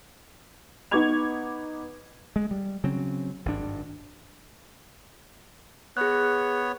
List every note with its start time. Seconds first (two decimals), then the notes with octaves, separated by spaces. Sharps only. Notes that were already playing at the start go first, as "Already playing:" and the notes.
0.91 B3 D#4 C#6 D6 G#6 F7
2.36 G#3
2.51 G3
2.84 C#3 F#3 C4 C#4
3.46 G#1 G2 D4
5.97 B3 G#4 C#5 F#6